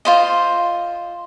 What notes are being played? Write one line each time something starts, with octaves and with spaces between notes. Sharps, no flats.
F4 C5 D#5